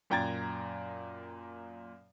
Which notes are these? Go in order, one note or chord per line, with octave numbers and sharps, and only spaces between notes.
F#2 A#2 G5 A#5 G#6 A6